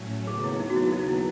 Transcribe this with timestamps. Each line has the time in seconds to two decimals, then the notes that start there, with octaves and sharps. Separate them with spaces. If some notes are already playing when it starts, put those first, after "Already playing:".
Already playing: A2 F#3 A3 C#4
0.27 D#2 C#3 F#3 B3 G#4
0.44 E4
0.60 D#4
0.70 F#4
0.76 E4
0.92 D#4
1.08 E4